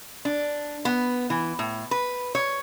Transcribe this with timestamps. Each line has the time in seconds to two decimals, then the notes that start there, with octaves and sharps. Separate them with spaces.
0.25 D4
0.85 B3
1.30 E3
1.59 A2
1.91 B4
2.35 C#5